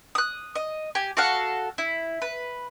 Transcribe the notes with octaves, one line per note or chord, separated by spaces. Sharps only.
D#6 F#6
D#5
G4 G#5
F#4 A4 F5 F#5
E4
B4